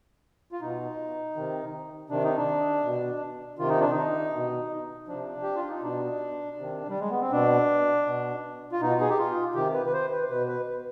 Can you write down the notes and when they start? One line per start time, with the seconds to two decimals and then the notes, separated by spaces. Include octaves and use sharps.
0.52 F4
0.61 B2 D#4
1.36 C3 D#3
2.10 C3 D#3 D4
2.23 D#4
2.37 D4
2.85 B2
3.59 C3 D#3 F4
3.70 D#4
3.81 D4
3.90 D#4
4.34 B2
5.08 C3 F3 D4
5.42 G4
5.56 F4
5.69 D#4
5.82 B2 D4
6.57 C3 D#3
6.89 G3
7.00 G#3
7.10 B3
7.21 C4
7.32 B2 D4
8.06 B2
8.72 F4
8.81 B2 D#4
9.01 G#4
9.10 G4
9.18 F4
9.55 C3 D#3 G4
9.74 B4
9.86 B4
9.93 C5
10.11 B4
10.30 B2 B4
10.48 B4